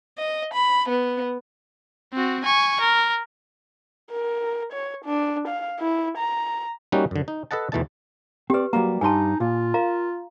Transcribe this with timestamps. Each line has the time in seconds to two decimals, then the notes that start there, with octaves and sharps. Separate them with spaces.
0.18 D#5
0.53 B5
0.88 B3
2.14 C4 F#4
2.44 G#5 C#6
2.81 A#4
4.10 A#4
4.73 C#5
5.05 D4
5.48 F5
5.79 E4
6.17 A#5
6.92 G3 A#3 C#4 D#4 F#4
7.11 F#2 D3
7.28 D#4
7.51 A4 B4 D#5 F#5 A5
7.72 E2 B2 E3 A3 D#4 A5
8.50 C4 G4 B4 D5
8.73 F#3 G3 A#3 A#5
9.01 G2 G3 D#4 G#5 A5 C6
9.40 A#2 F4
9.74 A#4 F5 A#5